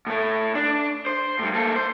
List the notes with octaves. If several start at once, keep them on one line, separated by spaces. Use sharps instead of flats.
A2 A3
D4
C5
A2 G3
A#3 A4
C5